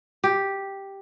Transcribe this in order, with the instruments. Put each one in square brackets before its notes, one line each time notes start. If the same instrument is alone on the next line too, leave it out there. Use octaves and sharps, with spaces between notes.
[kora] G4